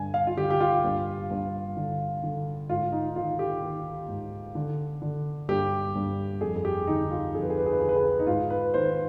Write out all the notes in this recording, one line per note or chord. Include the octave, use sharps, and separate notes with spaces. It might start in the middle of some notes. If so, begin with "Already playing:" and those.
Already playing: G2 D3 G#5
F5
F4
D3 G4
G4
F4
G2
G2
D3
D3
G#2 F4
D#4
D#3 F4
G4
D#3
G#2
D3
D3
G2 G4
G2
F2 G#4
G#4
G4
D3 D#4
F4
F2 G#4
B4
G#4
B4
G#4
B4
D3 G#4
B4
G#4
D#4
G#2 F4
B4
D#3 C5